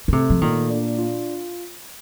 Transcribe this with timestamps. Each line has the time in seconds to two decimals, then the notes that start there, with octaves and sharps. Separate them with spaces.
0.08 D3
0.12 C3 A3
0.30 F3
0.42 A#2 D#3
0.70 D4
0.98 F4